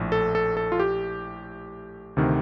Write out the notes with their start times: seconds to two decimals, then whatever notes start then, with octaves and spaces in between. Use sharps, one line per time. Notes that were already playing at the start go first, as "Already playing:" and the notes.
Already playing: A#1 A2
0.12 A4
0.35 A4
0.57 A4
0.72 F4
0.80 G4
2.17 D2 C3 D#3